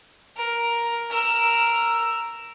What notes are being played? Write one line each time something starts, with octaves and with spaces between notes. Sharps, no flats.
A#4
A#4 E6